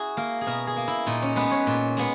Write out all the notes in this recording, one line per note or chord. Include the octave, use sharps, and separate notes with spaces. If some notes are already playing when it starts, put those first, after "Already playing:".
Already playing: E4 F#4 G#4
A#3 A#4
G#4
B2 A#4
G#4
A#3
E4
A#2 D#4
C#4
G#3 B3 B4
C#5
A#2
G#3 B3